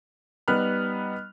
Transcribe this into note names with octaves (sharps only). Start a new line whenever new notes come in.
G3 B3 D#4 B5 F6 F#6